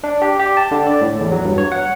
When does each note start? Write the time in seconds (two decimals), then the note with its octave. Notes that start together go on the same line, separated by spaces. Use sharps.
0.04 D4
0.22 G4
0.39 G4
0.57 A5
0.71 D3
0.87 D5
1.01 A2
1.21 E2
1.32 F#3
1.45 G2
1.58 C#5
1.72 F#5